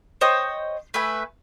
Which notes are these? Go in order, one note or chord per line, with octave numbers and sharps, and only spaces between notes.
C5 C#5 D#5 G5
A3 B4 E5 G#5